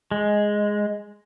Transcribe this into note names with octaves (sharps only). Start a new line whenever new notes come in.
G#3